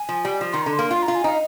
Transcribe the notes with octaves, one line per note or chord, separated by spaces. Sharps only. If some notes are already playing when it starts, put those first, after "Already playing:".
Already playing: G#5
F3
G3
F3
D#3 C6
D3 A#5
C6
A#3
F4 C6
A#5
F4
G#5
D#4 F5